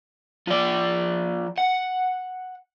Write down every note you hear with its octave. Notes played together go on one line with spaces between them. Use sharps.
F3 D5
F#5